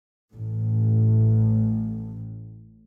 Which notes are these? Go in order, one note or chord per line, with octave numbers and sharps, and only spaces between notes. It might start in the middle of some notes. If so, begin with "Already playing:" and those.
A1 A2